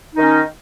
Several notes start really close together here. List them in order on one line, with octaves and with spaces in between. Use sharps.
D#4 D#3 C#4